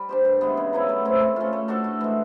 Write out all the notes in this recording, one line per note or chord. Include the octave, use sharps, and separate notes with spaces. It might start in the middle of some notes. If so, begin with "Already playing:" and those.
Already playing: G3
D4 G4 C5
G2
E3 G#3 B3
C#3
F#3 B3 E4
A3
C4 E4
A3
C#4 F4
A3
D4 F#4 A4
A2
E3 G#3